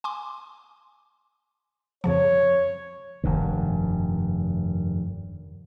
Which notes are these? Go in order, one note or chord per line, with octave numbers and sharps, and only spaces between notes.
G#5 C6 D6
F2 C#3 F3 C#5
F1 G2 D#3